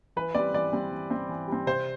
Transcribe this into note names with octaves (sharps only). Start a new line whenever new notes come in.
E3 B4
G3 C4 D5
E3 D5
G3 C4
E3
G3 C4
E3
G3 C4
C3 C5